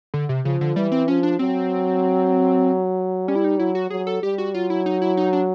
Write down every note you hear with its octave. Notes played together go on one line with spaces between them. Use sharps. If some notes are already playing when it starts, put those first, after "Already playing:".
D3
C3
C#3 F3
D3
E3 G3
C4
F3 C#4
D4
F#3 C4
G3 C#4
E4
D#4
F#3 E4
F#4
F#3 G#4
A4
G3 G4
F#4
F#3 F4
E4
D#4
E4
D#4
D4